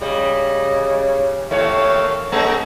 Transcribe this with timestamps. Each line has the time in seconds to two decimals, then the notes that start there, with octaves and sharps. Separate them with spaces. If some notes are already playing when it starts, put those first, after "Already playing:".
0.01 C#3 G3 D#5
1.51 D#2 A3 A#3 C#5 F5
2.32 A3 C#4 G#4 A#5